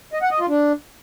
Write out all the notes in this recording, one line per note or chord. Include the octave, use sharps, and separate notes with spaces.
D#5
F#5
D#5
F4
D4